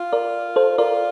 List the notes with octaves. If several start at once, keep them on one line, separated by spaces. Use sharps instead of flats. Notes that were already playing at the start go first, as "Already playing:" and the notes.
Already playing: F4
A#4 D5
A4 C5
F4 A#4 D5